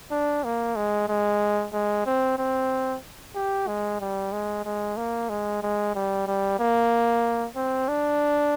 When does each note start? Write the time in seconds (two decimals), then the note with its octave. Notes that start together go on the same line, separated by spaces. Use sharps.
0.11 D4
0.44 A#3
0.76 G#3
1.09 G#3
1.73 G#3
2.06 C4
2.38 C4
3.35 G4
3.67 G#3
4.01 G3
4.32 G#3
4.65 G#3
4.97 A#3
5.30 G#3
5.63 G#3
5.95 G3
6.27 G3
6.60 A#3
7.56 C4
7.89 D4